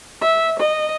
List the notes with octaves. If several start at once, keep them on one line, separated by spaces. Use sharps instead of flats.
E5
D#5